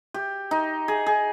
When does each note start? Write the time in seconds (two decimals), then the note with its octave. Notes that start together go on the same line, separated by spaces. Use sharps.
0.14 G4
0.51 D#4
0.88 G#4
1.06 G#4